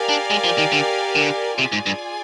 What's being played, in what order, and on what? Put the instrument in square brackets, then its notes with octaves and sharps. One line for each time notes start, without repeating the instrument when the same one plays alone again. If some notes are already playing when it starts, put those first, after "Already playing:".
Already playing: [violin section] G4 A#4 D5 F5 G#5
[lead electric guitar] D4
G#3
F3
D#3
D3
D3
[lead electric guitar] C3 [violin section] F4 G#4 D5 G#5
[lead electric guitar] G#2
G2